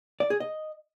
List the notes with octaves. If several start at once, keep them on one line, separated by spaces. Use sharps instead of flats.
D5
G#4
D#5